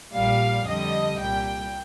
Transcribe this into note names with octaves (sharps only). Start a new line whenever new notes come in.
A#1 A#2 G3 F5
F2 D3 G3 D#5
C2 A#2 G3 G5